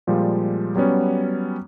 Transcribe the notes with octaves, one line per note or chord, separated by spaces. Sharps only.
A#2 F3 G3 G#3
F#3 G3 B3 C#4